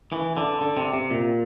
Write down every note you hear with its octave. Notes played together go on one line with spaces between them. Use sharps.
E3
D3
D3
C3
C3
A#2